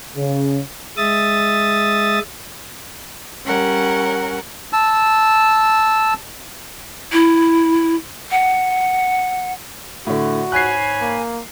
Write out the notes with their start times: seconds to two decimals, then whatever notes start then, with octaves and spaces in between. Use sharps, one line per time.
0.16 C#3
0.97 G#3 E5 D#6 A6
3.45 G3 C#4 A#4 F#5
4.73 A5 E6
7.12 E4
8.31 F#5
10.07 A2 D3 F#4
10.52 G#2 C#5 G#5 B5 F#6 C7
11.01 A#3